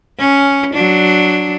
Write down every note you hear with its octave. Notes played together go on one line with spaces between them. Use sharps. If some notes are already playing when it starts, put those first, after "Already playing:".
C#4
F#3 D4